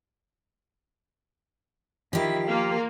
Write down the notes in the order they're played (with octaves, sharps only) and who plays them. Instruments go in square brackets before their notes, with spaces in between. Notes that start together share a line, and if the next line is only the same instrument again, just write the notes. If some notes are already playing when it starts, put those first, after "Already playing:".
[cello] D#3 E4 [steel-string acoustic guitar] F3 G4
[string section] A#3 [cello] F4 F5